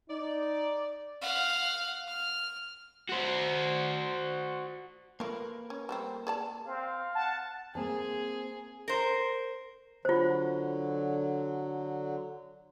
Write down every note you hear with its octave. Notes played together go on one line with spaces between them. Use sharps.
D#4 D5
F5 F#5
F6
F#4 C5
A3 A#3 F4 A#4 B4
C#4
G3 A3 C4
G#4 D5 A5
C4 F5
F#5 A5
A#3 C4 G#4 A5
A#4 C5
D3 F#3 F4 C5